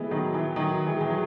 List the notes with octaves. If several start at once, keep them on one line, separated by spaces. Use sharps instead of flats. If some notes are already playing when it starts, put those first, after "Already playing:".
Already playing: E3 G#3 A3 B3
D#3 F#3
E3
D#3 F#3
E3 G#3
E3
F#3